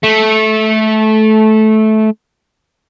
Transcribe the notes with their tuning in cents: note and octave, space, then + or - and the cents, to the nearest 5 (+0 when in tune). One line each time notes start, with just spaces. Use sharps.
A3 -15